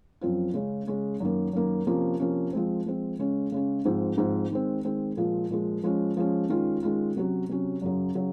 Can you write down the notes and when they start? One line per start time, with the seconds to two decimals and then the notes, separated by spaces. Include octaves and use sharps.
0.21 F#2 F3 C4 F4
0.54 C#3 G#3 C#4
0.87 C#3 G#3 C#4
1.20 F#2 D#3 A#3
1.53 F#2 D#3 A#3
1.87 C3 F3 A#3 C#4
2.20 C3 F3 A#3 C#4
2.53 F3 G#3 C4
2.86 F3 G#3 C4
3.19 C#3 G#3 C#4
3.52 C#3 G#3 C#4
3.85 G#2 F3 C4
4.18 G#2 F3 C4
4.51 D#3 G#3 C4
4.85 D#3 G#3 C4
5.17 A#2 F3 G#3
5.50 A#2 F3 G#3
5.83 F3 G#3 C#4
6.17 F3 G#3 C#4
6.49 D#3 G#3 C#4 F4
6.83 D#3 G#3 C#4 F4
7.16 C3 F#3 C#4 F#4
7.49 C3 F#3 C#4 F#4
7.82 F#2 C#3 F#3
8.15 C#3 F#3